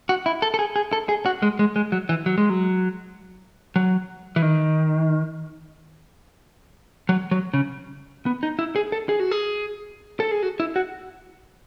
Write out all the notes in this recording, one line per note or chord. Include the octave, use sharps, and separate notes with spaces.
F#4
E4
A4
A4
G#4
G#4
A4
G#4
F#4
G#3
G#3
G#3
F#3
E3
F#3
G#3
F#3
F#3
E3
D#3
F#3
F#3
C#3
B3
D#4
E4
G#4
A4
G#4
F#4
G#4
A4
G#4
F#4
E4
F#4